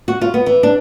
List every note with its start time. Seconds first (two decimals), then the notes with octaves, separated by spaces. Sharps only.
0.08 F#4
0.21 F4
0.34 B3
0.46 E3
0.63 D4